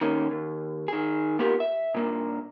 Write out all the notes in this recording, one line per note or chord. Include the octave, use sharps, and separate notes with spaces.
D#3 A#3 C#4
D#2
D#3 G#4
A#3 B3 F4 G4 A#4
E5
A#2 G3 A#3 D4